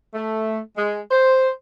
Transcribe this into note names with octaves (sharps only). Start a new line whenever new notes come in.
A3
G#3
C5